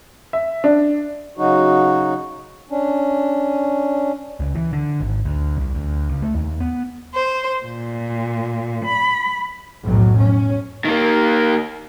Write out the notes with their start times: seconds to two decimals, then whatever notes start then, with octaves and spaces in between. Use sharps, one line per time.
0.33 E5
0.64 D4
1.38 C#3 F#3 D#4 F#4
2.70 C#4 D4
4.40 C#2
4.55 E3
4.73 D3
5.01 G#1
5.25 D2
5.58 C2
5.75 D2
6.09 C#2
6.22 A3
6.35 D#2
6.60 B3
7.13 C5
7.65 A#2
8.85 B5
9.83 B1 F2 A2 F#3
10.17 C#4
10.85 D#3 A#3